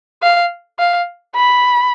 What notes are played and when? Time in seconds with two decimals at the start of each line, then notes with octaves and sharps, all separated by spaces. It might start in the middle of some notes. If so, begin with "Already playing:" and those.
0.22 F5
0.79 F5
1.35 B5